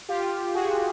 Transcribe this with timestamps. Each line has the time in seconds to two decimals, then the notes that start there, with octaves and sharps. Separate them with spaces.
0.09 F4 G4
0.54 F#4 G#4